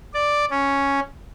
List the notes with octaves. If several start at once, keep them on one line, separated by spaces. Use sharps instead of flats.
D5
C#4